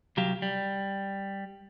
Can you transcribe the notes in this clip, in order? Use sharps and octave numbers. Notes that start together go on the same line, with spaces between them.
C2 F#3 G4 F5
G3